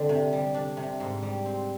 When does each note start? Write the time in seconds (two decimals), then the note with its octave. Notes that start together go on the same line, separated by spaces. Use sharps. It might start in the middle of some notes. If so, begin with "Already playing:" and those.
Already playing: D3 C4
0.09 C3
0.33 G3
0.54 D4
0.77 C3
1.00 G#2
1.23 G3
1.45 C4